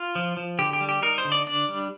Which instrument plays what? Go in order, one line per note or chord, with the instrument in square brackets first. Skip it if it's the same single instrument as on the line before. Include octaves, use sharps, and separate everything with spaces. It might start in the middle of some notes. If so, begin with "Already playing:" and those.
Already playing: [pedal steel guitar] F4
F3
F3
D3 G4
G4
G3
G4
D#4 A#4
C5
D3
D5
D4 D5
G3